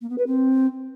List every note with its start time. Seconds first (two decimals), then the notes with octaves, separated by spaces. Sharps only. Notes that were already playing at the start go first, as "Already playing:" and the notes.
0.01 A#3
0.09 B3
0.18 B4
0.26 C4